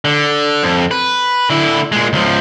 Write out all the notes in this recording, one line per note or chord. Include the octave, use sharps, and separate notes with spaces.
D3
F2
B4
D3 E4
A#2 G#3
C#2 F3